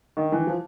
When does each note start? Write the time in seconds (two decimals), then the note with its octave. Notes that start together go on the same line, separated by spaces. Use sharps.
0.17 D#3
0.32 E3
0.47 F3